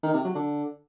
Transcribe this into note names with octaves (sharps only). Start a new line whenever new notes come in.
D#3
C3
F#3
D3